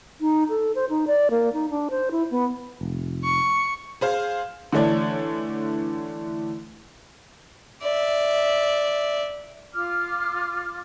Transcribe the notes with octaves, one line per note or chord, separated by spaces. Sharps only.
D#4
A4
C5
D#4
D5
A#3
D#4
D4
C5
E4
B3
F1
C#6
G#4 C5 F5
D3 E3 A3 D4 C#5
D5 E5
F4 D6 F6